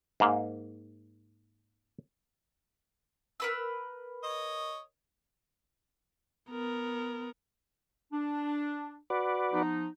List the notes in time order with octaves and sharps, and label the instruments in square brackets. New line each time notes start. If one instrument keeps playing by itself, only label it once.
[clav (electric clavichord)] G#2 A#3
[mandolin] A#4 B4 E6
[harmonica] C#5 D#5
[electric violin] B3 A#4
[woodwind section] D4
[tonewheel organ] F#4 B4 D5
[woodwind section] F3 B3 D#4